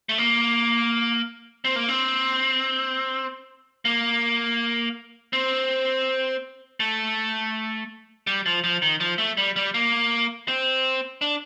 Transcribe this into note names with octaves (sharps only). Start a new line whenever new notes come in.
A3
A#3
C4
A#3
C4
A#3
C4
A3
G3
F3
F3
D#3
F3
A3
G3
G3
A#3
C4
D4